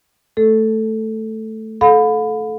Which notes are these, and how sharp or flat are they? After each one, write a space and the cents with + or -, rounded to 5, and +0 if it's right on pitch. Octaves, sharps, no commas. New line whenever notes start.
A3 +0 A4 +0
A4 -20 F5 +45 B5 +20